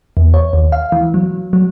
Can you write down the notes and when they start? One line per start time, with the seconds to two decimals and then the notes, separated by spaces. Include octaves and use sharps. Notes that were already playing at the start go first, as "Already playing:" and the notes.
0.17 E2
0.34 C#5
0.53 D#2
0.72 F5
0.92 E3
1.14 F#3
1.53 F#3